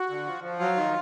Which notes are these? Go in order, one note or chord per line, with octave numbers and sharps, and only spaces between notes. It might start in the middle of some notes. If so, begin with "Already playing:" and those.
Already playing: F#4
D3
F3
F3
F#3 F4
D#3